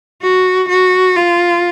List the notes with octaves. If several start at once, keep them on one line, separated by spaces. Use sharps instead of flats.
F#4
F#4
F4